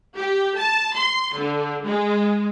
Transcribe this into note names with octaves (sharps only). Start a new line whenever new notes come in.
G4
A5
C6
D3
G#3